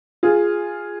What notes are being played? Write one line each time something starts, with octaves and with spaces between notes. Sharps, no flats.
F4 G#4